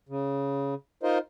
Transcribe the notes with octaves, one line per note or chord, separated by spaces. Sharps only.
C#3
D#4 F4 A#4 C5 D#5